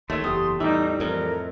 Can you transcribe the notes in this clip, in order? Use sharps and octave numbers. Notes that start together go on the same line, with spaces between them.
D#2 A3 C#5 E5 C6
F#1 E2 G4 D#6
E2 A2 E3 G3 D#4 E5
F2 A2 A#4